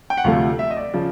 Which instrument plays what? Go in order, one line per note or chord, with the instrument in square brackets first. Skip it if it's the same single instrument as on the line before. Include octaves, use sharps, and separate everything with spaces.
[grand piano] G5
F#5
D2 C3 F3 A3 F5
E5
D#5
D5
C#3 F3